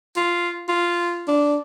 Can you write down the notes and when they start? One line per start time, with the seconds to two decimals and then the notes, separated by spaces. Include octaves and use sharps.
0.16 F4
0.69 F4
1.28 D4